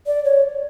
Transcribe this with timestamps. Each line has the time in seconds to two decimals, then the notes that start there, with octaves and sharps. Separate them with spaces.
0.07 D5
0.25 C#5